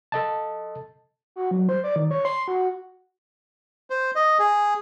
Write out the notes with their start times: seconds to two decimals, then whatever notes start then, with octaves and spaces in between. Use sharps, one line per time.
0.12 A4 D#5 A5
1.36 F#4
1.51 F#3
1.69 C5
1.84 D5
1.96 D#3
2.11 C#5
2.25 C6
2.48 F#4
3.90 C5
4.15 D#5
4.39 G#4